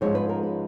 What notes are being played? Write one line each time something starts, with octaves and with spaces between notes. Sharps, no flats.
G#2 F3 G#3 C#4 C#5
B4
A#4
B4